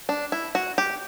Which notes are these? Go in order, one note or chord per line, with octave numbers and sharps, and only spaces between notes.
D4
E4
F#4
G4